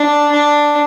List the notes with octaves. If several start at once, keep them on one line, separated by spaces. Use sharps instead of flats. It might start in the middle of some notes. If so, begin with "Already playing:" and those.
Already playing: D4
D4